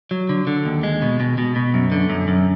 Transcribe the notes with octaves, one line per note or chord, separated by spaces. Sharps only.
F#3
D3
D3
D#2
G#3
B2
B2
B2
B2
F#2
D3
F#2
F#2